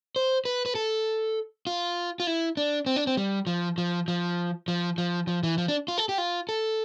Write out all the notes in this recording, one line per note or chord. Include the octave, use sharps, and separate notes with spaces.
C5
B4
B4
A4
F4
F4
E4
D4
C4
D4
C4
G3
F3
F3
F3
F3
F3
F3
E3
F3
D4
F4
A4
G4
F4
A4